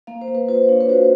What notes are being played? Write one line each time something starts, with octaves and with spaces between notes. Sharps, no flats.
A#3 F5
C5
A#3
B4
F4 C5
D4 C#5
B4
F#4 C5